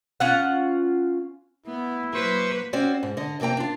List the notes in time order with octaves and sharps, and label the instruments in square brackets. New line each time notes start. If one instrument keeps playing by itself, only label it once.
[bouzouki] C#4 F4 F#5
[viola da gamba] B3 [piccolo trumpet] E4
[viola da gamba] F#3 A#3 B4 [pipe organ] C5 C#6
[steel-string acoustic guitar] C4 C#4 F#4 D5
G#2
D3 D#5
F2 C3 A#3 G5 A#5
D4 F4